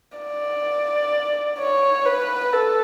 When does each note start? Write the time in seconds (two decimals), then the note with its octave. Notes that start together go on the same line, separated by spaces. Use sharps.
0.18 D5
1.59 C#5
2.05 B4
2.53 A4